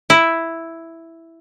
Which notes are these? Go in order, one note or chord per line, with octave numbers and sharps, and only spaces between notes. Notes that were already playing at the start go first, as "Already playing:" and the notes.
E4